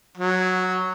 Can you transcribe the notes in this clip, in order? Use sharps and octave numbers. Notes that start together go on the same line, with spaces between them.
F#3